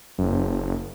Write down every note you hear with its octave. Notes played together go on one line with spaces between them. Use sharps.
F#1